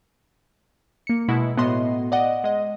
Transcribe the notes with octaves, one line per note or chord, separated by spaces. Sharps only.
A#3 C#7
B2 G#3 E4
A2 B3 F#4 D#5 C6
D5 D#5 F#5
G#3 D#5